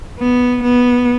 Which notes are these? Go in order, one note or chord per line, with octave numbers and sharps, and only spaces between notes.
B3
B3